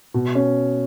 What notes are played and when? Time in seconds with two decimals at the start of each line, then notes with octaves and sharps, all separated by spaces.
0.14 B2
0.35 C#4